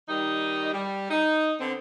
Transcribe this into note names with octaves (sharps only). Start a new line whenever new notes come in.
D#3 G3 D#4
G3
D#4
D3 B3 C4